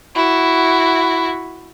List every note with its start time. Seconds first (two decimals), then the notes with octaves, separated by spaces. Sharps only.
0.15 E4 F#4